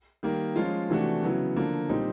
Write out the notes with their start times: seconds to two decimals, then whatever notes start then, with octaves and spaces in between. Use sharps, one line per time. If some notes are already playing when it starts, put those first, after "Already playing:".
0.23 D#3 G3 A#3
0.56 F3 G#3 C#4 F4
0.89 C3 E3 A3 D4 F#4
1.23 C#3 F#3 B3 E4
1.56 D3 F3 A#3
1.89 A#2 G3 C4 D#4